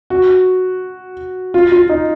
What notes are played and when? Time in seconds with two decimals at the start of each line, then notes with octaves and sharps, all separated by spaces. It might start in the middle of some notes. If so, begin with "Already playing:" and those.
0.10 F#4
1.54 F4
1.72 F4
1.89 D#4